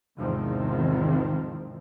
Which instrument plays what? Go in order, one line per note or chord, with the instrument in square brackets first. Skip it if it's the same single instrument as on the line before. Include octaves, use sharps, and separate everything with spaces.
[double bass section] E2 G#2 C3 D#3 F3 C4